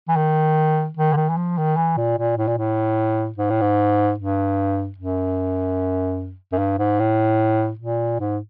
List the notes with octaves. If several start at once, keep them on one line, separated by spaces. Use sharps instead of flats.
E3
D#3
D#3
D3
D#3
E3
F3
D#3
E3
A#2
A#2
A2
A#2
A2
G#2
A2
G#2
G2
F#2
F#2
G2
G#2
A2
A#2
G#2